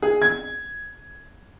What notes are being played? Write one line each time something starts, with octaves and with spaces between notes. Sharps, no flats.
G#4
G#6